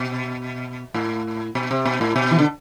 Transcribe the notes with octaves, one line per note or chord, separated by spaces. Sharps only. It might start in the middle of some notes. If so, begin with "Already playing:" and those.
Already playing: B2
A2
B2
C3
B2
A2
B2
E3
D3